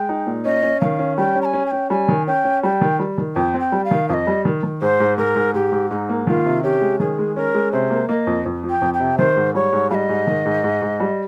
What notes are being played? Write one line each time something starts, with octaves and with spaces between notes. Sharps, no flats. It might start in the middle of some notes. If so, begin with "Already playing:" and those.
Already playing: G#3 G5
D#4
A#2
C#4 D#5
C#4
D#3 F5
C#4
G3 G5
C#4
A#5
G#5
C#4
G#5
C#4 G5
G3 G#5
D#3
C#4 G5
C#4
G3 G5
D#3
G3
D#3
F2 G5
C4
G5
G3
F5
D#3
F2 D#5 F5
G3
D#3
D#3
G#2 C5
G#2
G#2 A#4
G#2
G#2 G4
G#2
G#2 D#4
A#3
D#3 F4
C3
C#4 G4
G#3
D#3 G#4
G#3
C#4 A#4
G#3
C3 C5
A#3
A#3 D#5
F2
F2
F3
G5
F2
G5
C3
D#3 C5
G#2
G3 C#5
G#2
G3 D#5 F5
G#2
D#3
G#2
G#2
G#2
G3